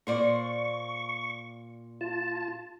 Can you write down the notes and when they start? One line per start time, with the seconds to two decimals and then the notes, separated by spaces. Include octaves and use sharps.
0.07 A#2 C5 D5 C#6
2.01 F4 A5